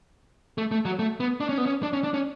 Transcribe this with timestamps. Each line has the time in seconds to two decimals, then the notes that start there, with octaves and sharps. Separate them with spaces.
0.58 A3
0.71 A3
0.85 F#3
0.99 A3
1.20 B3
1.40 D4
1.49 C#4
1.58 B3
1.66 C#4
1.83 D4
1.93 C#4
2.04 D4
2.14 C#4